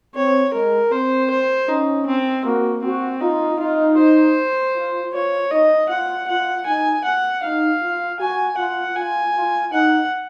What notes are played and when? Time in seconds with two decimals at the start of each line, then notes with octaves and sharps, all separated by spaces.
0.15 C4 C#5
0.54 G#3 A#4
0.92 C4 C5
1.31 C5
1.69 C#4 D#4
2.07 C4
2.45 A#3 F#4
2.83 C4 F#4
3.21 D#4 F4
3.60 D#4 F4
3.98 C5
4.76 F4
5.13 F4 C#5
5.51 D#4 D#5
5.89 F4 F#5
6.28 F4 F#5
6.67 D#4 G#5
7.05 F#5
7.43 D#4 F5
7.82 F4
8.20 F#4 G#5
8.58 F4 F#5
8.96 F4 G#5
9.35 F4
9.73 D#4 F#5